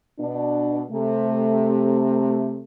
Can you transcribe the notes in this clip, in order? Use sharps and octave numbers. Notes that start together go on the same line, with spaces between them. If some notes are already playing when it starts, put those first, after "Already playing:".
B2 D4
C3 A3